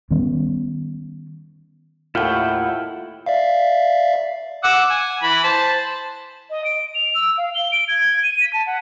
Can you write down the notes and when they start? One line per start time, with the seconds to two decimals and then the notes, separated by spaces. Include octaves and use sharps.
0.11 D#3 G3 B3 C#4
2.15 D#2 A2 E4 F4 F#5 G5
3.26 D5 E5 F5
4.64 F#5 D6 E6
4.90 G#5
5.23 E3 B5
5.44 C5 A5
6.50 D#5
6.64 D7
6.95 F7
7.15 E6
7.37 F5
7.54 G7
7.72 D7
7.88 G#6
8.23 D#7
8.41 B6
8.53 A5
8.66 F#5